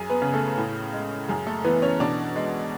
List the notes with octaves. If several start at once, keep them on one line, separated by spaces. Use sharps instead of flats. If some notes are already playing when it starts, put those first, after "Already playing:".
Already playing: F#2 G#4 G#5
B3 B4
C#3
A3 A4
A2
G#3
F#2 G#4
A3 A4
E3 B3 B4
C#4 C#5
B2 D4 D5
G#3